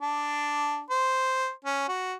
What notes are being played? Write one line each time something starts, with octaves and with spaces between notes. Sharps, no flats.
D4
C5
C#4
F#4